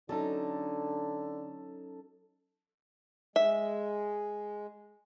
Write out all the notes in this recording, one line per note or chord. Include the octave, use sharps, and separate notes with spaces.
D3 F#3 C#4 D#4 A4
G#3 E5